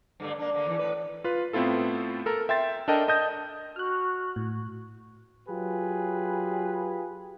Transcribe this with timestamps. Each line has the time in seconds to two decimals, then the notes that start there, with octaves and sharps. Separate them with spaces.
0.20 G2 D3 A3
0.39 A#3 D4
0.54 D3 A#3
0.66 E2 E3
0.79 A2 B4
1.24 F4 B4
1.53 A2 B3 C4 E4 F4 A4
2.26 A4 A#4 A#5
2.49 E5 G5 C6 A6
2.88 D4 A4 A#4 D#5 G5 A5
3.08 D#5 A5 D#6 G6 A#6
3.76 F#4 F6 F#6
4.36 A2
5.49 F#3 F4 G4 G#4 B4